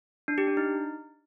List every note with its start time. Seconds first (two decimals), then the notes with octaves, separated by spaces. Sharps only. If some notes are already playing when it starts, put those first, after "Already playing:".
0.28 D4
0.38 G4
0.47 D4
0.57 D#4